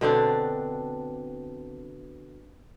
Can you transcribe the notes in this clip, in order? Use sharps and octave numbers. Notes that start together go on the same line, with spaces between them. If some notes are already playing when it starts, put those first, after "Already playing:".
B2 D3 C4 D4